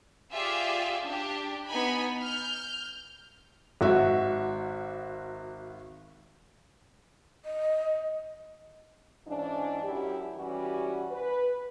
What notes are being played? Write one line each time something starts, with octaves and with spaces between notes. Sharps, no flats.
F4 G4 G#4 D5 E5
D4 G4
B3 D#4 G#5 B5
F6 G6
G#1 F#4 E5
D#5
G#2 E3 C#4 D4
F#2 E4 G4
E3 G3 C#4 F#4 G4
B4